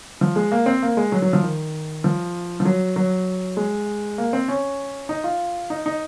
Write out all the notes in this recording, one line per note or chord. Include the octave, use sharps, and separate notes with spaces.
F3
G#3
A#3
C4
A#3
G#3
F#3
F#3
F3
D#3
F3
F3
F#3
F#3
G#3
A#3
C4
C#4
D#4
F4
D#4
D#4